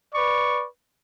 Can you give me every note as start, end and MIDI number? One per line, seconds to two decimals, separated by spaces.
0.15 0.67 71
0.15 0.67 74
0.15 0.67 85